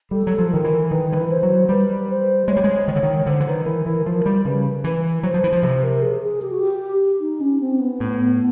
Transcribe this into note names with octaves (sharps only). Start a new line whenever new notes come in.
G3 A4
F#3
F3
D#3 A#4
E3
D#3 B4
F3
E3
C5
F#3
G3 B4
C5
G#3 C#5
G3
G#3
D#3 C#5
D3
D#3
D3 C5
E3
D#3 B4
E3 A#4
E3 A#4
F3 A#4
G3
C#3 B4
E3 B4
F#3 C5
F3
E3
F3
C3 C5
A#4
G#4
G#4
G4
F#4
G4
D#4
C#4
C4
B3
A2